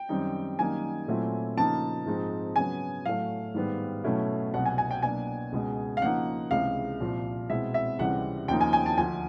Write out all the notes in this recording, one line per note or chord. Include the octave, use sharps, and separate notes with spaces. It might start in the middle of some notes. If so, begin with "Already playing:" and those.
Already playing: G5
F#2 D#3 G3 C4 D#4
F#2 D#3 G3 A#3 D#4 G#5
A#2 F#3 A3 C4 E4
C#3 F3 A#3 D#4 A5
G#2 F3 G#3 C4 D#4
C#3 F#3 B3 G#5
A2 F#3 A3 F5
G#2 D#3 G3 B3
B2 F#3 A3 C#4 E4
C2 B2 F#3 F#5
G#5
G#5
G5
B2 F#3 A#3 D4 G#5
C#2 B2 G#3
F5
C#3 F3 A#3 D#4 F#5
C#2 C3 E3 G#3 F5
C2 A#2 F3
B2 G#3 C4 E4 E5
E5
C#2 C3 E3 G3 C4 F#5
D#2 C#3 F3 A#3 D#4 G5
G#5
G#5
A5
D2 D3 F3 G#5